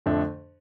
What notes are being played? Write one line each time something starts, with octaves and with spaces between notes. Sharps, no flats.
F2 D3 A3 D4